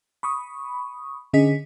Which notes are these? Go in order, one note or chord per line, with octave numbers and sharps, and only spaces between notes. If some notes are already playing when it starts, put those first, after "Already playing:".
B5 C#6 D#6
D3 C#4 G#4 D#5 B6